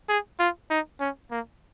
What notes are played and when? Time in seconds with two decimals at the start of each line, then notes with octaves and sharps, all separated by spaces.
0.09 G#4
0.40 F4
0.70 D#4
1.00 C#4
1.31 A#3